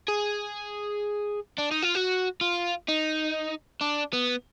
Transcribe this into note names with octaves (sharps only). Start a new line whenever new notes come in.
G#4
D4
D#4
F4
F#4
F4
D#4
D4
B3